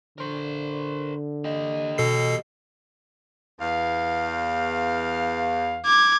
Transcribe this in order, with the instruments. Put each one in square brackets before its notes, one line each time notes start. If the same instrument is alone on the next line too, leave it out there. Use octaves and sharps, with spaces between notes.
[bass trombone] D3 [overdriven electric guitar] A#4 C5
[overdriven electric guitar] G4 D#5
[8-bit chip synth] B2 A4 C7
[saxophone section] E2 F5
[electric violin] D6 G#6